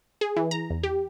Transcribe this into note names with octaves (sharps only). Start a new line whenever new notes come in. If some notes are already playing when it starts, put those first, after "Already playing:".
G#4
E3
A#5
E2
G4